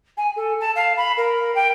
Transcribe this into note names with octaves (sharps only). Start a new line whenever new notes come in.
G#5
A4
A5
F5
B5
A#4
G5